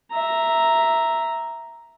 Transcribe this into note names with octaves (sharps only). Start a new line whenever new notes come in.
E5 A#5